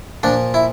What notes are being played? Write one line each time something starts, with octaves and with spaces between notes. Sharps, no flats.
A#2 F3 D4
E4